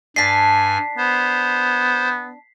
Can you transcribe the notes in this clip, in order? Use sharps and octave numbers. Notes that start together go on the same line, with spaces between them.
G2 D4 G#5 A5 B6 C7
B3 C5